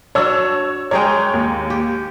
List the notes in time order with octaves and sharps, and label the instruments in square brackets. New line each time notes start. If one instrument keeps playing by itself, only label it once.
[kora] D4 F#4 [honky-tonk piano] C#5 E6
[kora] G#3 G#4 A#4 [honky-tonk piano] C#5 G5
[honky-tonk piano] D#2
[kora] G4